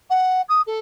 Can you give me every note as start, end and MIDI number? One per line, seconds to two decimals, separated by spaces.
0.10 0.41 78
0.48 0.61 87
0.67 0.79 69